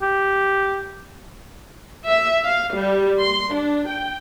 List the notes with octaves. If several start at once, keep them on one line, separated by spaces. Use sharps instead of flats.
G4
E5
F5
G3
C6
D4
G5